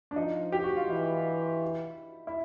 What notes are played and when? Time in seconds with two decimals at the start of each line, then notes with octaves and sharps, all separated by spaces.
0.11 D4
0.16 F3 D#4
0.52 G4
0.64 F#4
0.76 F4
0.89 E3 E4
2.27 E4